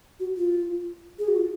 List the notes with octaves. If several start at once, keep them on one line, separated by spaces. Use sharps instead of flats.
F#4
F4
G#4
F#4
F4